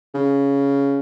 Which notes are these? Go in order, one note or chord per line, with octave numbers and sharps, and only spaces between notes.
C#3